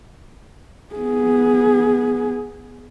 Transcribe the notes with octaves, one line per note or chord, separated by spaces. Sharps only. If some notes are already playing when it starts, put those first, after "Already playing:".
B3 G#4